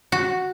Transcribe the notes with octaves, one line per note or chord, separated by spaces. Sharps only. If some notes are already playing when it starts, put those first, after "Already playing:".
F#4